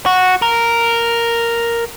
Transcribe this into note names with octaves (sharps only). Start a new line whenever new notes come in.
F#4
A#4